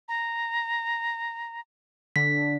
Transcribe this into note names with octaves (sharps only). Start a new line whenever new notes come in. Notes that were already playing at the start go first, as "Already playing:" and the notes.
A#5
D3 B6